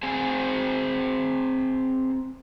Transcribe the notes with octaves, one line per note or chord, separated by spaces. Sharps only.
C4 G#4 C5 G#5